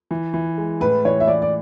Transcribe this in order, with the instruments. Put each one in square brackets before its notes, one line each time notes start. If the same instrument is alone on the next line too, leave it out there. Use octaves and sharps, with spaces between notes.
[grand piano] E3
E3
G#3
[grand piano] A2 [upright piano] B4
[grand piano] E3 [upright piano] C#5
[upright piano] E5
[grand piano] E3 [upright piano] D5
[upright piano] D5